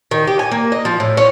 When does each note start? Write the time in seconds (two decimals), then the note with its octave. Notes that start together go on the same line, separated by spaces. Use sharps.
0.11 D#3
0.27 G4
0.39 G#5
0.52 A#3
0.72 D#5
0.85 F3
1.00 A2
1.17 C#4